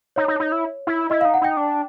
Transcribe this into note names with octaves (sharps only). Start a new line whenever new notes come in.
D#4 C#5
D#4
D#4
E4
E4
E4 D#5
D#4 F5
F#5
D#4 G5
D4